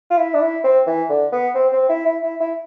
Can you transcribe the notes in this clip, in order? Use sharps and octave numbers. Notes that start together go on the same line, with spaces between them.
F4
E4
D4
E4
C4
E3
D3
B3
C4
C4
E4
E4
E4
E4